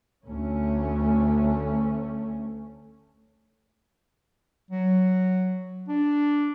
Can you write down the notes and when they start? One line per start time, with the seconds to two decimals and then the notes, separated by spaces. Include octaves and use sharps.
0.25 D2 A3 C#4
4.71 F#3
5.88 D4